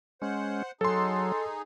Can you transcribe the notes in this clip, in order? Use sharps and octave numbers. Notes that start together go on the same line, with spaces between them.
G#3 C#4 C5 F#5
F#3 D#4 G#4 A4 C6